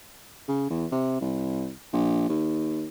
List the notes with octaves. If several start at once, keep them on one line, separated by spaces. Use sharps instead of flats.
C#3
E2
C3
C2
A#1
D#2